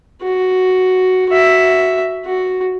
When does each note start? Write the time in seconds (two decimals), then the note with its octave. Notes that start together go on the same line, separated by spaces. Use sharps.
0.22 F#4
1.30 F#4 E5
2.26 F#4